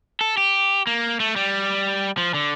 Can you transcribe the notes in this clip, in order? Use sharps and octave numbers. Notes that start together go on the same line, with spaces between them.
A4
G4
A#3
A3
G3
F3
D3